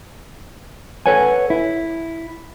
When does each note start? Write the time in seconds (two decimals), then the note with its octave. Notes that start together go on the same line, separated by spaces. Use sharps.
1.06 A4 B4 C#5 F#5 G#5
1.50 E4